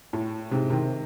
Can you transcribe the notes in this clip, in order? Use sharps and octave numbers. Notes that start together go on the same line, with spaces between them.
A2
G#2 C3
C3 D#3